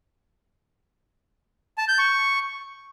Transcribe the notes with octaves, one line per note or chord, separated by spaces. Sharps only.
A5
G6
C#6